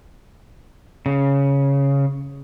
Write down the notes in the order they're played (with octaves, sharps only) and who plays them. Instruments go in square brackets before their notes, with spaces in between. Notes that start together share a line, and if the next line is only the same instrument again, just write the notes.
[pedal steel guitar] C#3